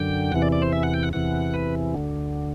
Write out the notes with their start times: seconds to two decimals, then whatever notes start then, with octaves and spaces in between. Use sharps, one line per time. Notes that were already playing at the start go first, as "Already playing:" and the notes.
Already playing: F#2 D3 G5
0.32 E2 C3 E3 F#5
0.42 D5
0.52 D5
0.62 C5
0.73 E5
0.83 F#5
0.94 G5
1.03 F#5
1.13 E2 C3 E3 F#5
1.54 B4
1.94 D2 D3